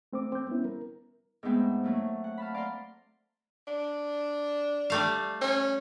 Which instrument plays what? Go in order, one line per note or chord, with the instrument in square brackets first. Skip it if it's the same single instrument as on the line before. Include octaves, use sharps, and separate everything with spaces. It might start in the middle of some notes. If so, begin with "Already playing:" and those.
[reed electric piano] A3 C4 C5 D6
C4 G6
G3 B3 C#4 E4
A#4
[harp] G#2 G#3 A3 B3 C4
F#3 A3 A#3
F#5
F5 A5 B5
D5 F5 A#5 C6
[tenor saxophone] D4
[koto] G3 A3 F5
[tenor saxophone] C#4